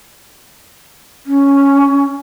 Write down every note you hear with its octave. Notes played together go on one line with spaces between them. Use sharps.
C#4